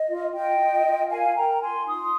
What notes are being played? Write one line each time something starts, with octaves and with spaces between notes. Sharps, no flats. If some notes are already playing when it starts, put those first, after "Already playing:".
Already playing: D#5
F4
F4 D#5 G5
F4
F4
A#4 F5 G#5
A#4 G5 A#5
F4 G#5 C6
D#4 C6 D#6